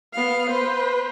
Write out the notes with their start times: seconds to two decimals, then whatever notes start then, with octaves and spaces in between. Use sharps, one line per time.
0.13 B3 F5
0.50 B4 C5